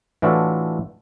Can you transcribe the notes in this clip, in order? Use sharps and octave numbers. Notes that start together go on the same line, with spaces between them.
A2 E3 D4 F4 F#4 A4